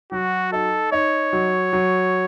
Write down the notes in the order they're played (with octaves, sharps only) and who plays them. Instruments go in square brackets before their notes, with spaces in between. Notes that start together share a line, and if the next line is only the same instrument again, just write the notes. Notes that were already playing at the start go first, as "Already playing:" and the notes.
[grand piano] F#3 [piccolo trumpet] F#4
[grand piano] D#4 [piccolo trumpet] A4
[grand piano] D#4 [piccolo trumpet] C#5
[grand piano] F#3
F#3